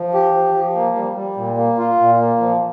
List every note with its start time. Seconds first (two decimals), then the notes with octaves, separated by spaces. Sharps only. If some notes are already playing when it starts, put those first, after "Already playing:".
Already playing: F3
0.14 G4
0.34 F3
0.55 F3
0.75 A#3
0.96 G3
1.16 G3
1.37 A#2
1.58 A#3
1.78 F4
1.99 A#2
2.20 A#3
2.40 F3